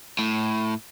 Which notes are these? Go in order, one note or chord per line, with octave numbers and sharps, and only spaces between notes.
A2